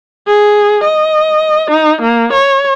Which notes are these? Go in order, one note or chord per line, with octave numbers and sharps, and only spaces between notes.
G#4
D#5
D#4
A#3
C#5